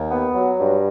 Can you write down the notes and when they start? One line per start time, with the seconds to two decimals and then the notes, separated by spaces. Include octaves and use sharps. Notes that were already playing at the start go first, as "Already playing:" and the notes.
Already playing: D#2
0.11 B3
0.35 F#3
0.60 G2